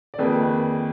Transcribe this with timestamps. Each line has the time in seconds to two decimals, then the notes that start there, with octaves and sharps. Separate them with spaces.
0.14 D5
0.18 F2 D#3 A#3 G#4 B4